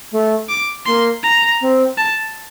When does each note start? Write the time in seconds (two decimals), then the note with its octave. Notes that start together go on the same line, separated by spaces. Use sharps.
0.12 A3
0.49 D6
0.86 A#3 C6
1.23 A#5
1.61 C4
1.98 A5